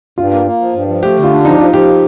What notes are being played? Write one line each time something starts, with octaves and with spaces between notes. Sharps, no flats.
G2 F4
A#3
A#3
F3
G2
F3
A3 G4
D3
F4
D4
F3 D#4
F3 F4
F3 G4